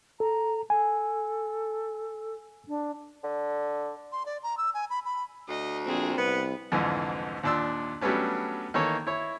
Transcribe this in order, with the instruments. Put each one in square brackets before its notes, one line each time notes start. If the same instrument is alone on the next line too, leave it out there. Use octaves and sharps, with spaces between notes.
[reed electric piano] A4 [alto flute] A#5
[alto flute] A4 [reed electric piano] G#5
[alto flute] D4
[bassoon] D3
[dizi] C6
D5
A#5
E6
G#5
B5
B5
[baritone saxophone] D2 [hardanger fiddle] D#5
[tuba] A#1 [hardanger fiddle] C4 G#4
[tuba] C2 [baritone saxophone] B3 [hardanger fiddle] B4
[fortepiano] C2 F2 G#2 D3 E3
D#2 A#2 D4 C6 E6
F#3 G3 A3 B3 C#4 D4
D#3 E3 A#3 A4 C#5
E4 C#5